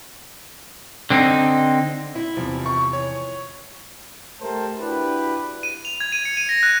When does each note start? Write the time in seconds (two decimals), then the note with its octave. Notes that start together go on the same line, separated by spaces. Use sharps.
1.10 D3 C4 D4 D#4
2.15 E4
2.37 E2 C3 D#3 F3
2.66 C#6
2.93 C#5
4.41 A3 G4 A#4 C5 A5
4.78 D4 E4 F#4 G4 B4
5.63 D#7
5.85 F7
6.00 G#6
6.12 D#7
6.25 C#7
6.37 D#7
6.49 A#6
6.63 F#6